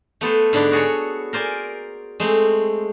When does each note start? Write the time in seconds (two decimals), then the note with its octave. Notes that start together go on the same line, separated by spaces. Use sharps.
0.21 A3 B3 A4 C5
0.53 G#2 D3 B4 D5
0.72 F#4 G#4 A4 C#5
1.33 A#4 C5 D5 G#5
2.20 G#3 A3 C4